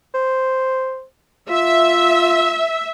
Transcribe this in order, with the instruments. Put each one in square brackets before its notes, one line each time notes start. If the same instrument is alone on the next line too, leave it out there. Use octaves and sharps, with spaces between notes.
[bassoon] C5
[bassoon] F4 [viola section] E5